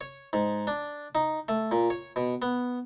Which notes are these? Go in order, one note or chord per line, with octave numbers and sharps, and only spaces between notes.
C#5
G#2
D4
D#4
A3
A#2
C#5
B2
B3